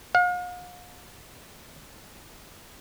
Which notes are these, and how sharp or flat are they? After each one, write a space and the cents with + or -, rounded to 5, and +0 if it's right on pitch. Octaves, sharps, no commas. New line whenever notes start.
F5 +45